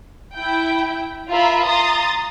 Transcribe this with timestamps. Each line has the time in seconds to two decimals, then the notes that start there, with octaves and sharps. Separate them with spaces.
0.35 E4 G5
1.31 F4 A#4 E5 A#5 B5
1.64 A#5 C6 D#6 A6